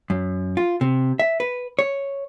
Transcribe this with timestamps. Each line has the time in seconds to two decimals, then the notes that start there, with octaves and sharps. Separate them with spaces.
0.10 F#2
0.57 F4
0.81 C3
1.19 E5
1.40 B4
1.79 C#5